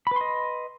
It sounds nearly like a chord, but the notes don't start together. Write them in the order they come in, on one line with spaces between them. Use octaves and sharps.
B5 B4 C6 D#5